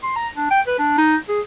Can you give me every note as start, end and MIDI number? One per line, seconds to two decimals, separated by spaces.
0.03 0.13 84
0.16 0.28 82
0.36 0.48 62
0.51 0.61 79
0.67 0.74 71
0.79 0.93 62
0.98 1.17 63
1.29 1.40 68